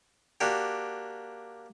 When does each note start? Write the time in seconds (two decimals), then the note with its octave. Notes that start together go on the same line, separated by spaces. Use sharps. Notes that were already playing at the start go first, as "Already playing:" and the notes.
0.40 A#3 D4 F#4 G4